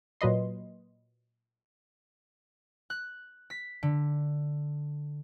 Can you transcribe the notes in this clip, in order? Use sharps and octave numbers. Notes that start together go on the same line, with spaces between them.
A#2 F#3 B4 D#5 C6
F#6
B6
D3